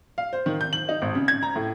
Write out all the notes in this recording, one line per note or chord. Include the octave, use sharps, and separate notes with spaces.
F5
C5
D#3
G6
F#7
D#4
G#1
C#3
G#6
A#5
A2